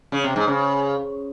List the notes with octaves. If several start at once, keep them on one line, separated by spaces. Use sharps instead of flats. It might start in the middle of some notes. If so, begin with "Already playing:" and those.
C#3
C3
G#2
C#3